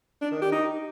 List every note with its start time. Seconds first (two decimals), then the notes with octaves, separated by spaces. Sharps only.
0.21 D4
0.32 D#3
0.42 G4
0.52 D#4